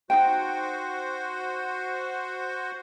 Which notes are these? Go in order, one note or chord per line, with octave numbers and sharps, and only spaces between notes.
D#4 F4 F#4 C5 G5